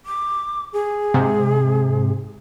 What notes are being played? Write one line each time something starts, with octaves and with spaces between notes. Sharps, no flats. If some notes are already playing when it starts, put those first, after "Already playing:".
D6
G#4
G#2 C3